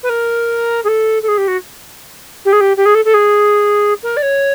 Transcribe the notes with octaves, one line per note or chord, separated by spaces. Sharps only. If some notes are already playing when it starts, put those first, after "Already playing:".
B4
A#4
G#4
A4
A4
G#4
G4
F#4
G4
G#4
G4
G4
G#4
A4
A4
G#4
A#4
D5
C#5